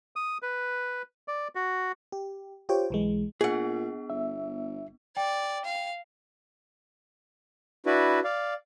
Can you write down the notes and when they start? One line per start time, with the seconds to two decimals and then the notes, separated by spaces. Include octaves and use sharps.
0.16 D#6
0.42 B4
1.28 D5
1.55 F#4
2.12 G4
2.69 F4 G4 C5 C#5 G5
2.90 B1 E3 G#3
3.41 A#2 B3 D4 G#4 F#5
4.10 G1 E5
5.17 D5 G5
5.65 F5
7.86 D4 E4 F#4 B4
8.24 D5 F5